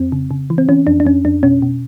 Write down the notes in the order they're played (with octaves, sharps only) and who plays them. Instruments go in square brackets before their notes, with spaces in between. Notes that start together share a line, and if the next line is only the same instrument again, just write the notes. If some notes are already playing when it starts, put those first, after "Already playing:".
Already playing: [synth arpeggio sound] F2 C4
C#3
C#3
E3
C4
E3 C#4
F2 D4
D4
F2 C#4
F2 D4
B2 C#4
B2